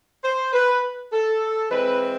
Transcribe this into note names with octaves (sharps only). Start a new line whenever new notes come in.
C5
B4
A4
E3 G#3 C4 B4